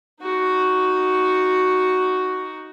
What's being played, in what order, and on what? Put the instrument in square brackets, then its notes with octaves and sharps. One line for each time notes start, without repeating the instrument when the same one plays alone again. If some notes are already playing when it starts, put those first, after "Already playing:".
[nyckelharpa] D#4 F#4